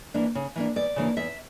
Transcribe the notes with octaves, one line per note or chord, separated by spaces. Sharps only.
E3 A#3 D4
C#3
E3 A#3 D4
E2 D5
C#3 E3 A#3 D4
E2 E5